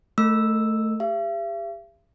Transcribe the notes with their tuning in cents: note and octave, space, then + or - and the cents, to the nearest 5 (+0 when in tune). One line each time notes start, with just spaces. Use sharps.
A3 +0 A#4 -35 E6 +0
G4 +35 E5 +45